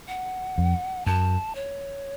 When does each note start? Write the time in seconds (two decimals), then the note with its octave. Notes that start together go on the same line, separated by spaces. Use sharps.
0.08 F#5
0.58 F2
1.06 F#2 A5
1.55 C#5